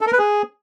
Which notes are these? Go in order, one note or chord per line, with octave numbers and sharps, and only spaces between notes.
A4
A#4
B4
G#4